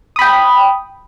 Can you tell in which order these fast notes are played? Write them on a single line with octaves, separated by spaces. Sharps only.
D#6 B5 G5